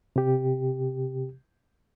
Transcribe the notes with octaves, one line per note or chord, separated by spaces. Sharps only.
C3 G4